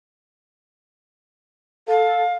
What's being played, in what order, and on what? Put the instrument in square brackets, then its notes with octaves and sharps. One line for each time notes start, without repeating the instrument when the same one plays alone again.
[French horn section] A4 [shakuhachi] F5